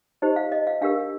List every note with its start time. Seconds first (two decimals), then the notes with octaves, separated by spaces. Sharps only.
0.22 D#4 G4 C5 D#5
0.36 F5
0.52 D#5
0.67 F5
0.81 D4 G4 A#4 F5